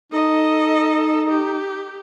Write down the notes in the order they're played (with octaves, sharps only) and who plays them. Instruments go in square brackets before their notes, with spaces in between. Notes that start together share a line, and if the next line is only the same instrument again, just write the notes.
[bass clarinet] D#4 [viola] A4 D#5
[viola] G4